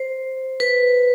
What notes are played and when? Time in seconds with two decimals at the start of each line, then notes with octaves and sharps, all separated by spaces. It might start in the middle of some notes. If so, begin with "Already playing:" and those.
Already playing: C5
0.60 B4